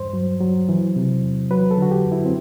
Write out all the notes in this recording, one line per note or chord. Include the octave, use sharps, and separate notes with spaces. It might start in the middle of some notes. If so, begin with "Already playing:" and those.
Already playing: E2 G2 C5
F#3
F#3
E3
C3
E2
F#3 B4
A4
D3 F#4
G4
F#2
E4
C4